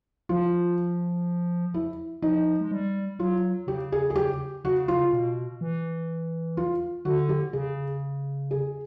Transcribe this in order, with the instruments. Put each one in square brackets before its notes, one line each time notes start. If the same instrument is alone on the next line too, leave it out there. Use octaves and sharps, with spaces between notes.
[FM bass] F3 [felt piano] F4
[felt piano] E4
[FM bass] F3 [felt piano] D#4
[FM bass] G#3
G3
[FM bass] F#3 [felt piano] F4
[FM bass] C#3 [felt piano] G4
[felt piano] G#4
G#4
G4
[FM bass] C#3 [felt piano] F#4
[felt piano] F4
[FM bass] B2
E3
[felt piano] F4
[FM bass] D3 [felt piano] F#4
[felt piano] G4
[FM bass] C#3 [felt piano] G#4
[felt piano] G#4